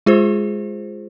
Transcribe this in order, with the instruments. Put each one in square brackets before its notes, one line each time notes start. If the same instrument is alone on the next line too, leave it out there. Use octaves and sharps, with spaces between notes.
[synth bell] G#3 F4 G#4 C5